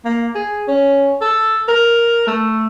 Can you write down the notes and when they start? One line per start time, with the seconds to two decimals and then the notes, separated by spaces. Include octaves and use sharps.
0.05 A#3
0.35 G#4
0.68 C#4
1.21 A4
1.68 A#4
2.27 A3